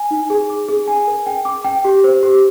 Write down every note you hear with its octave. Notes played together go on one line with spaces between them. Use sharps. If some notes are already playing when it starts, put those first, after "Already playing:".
Already playing: G#5
D#4
G#4
D6
G#4
G#5
A#4
G5
D6
G5
G4
C5
G4